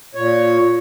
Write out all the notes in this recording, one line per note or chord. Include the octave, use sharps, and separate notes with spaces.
A#2 C#5